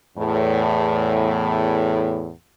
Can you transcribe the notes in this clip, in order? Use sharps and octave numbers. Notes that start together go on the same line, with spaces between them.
E2 A2